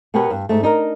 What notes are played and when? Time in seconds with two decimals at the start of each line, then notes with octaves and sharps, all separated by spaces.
0.14 B2 B3 G4 A#4 B4 C#5
0.30 G2
0.49 G#2 A3
0.62 D4 D#4 G#4 A#4